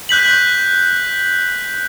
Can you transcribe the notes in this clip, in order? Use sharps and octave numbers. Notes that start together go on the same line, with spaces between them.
F#6 G6 B6 F#7